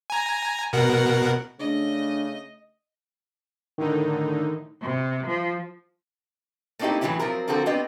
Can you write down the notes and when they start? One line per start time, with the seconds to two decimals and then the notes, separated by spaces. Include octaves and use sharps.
0.10 G#5 A#5
0.73 B2 A#4 F#5
1.60 C#3 A3 D4 D#5
3.78 A2 D3 D#3 D#4
4.82 C3
5.27 F3
6.79 A3 A#3 C4 D#4 E4 G4
7.01 A2 C3 E3 F#3 E4 G4
7.20 F3 F#3 C4 A#4
7.48 D3 F3 C4 F#4 A4 A#4
7.66 B3 C4 D4 G4 D#5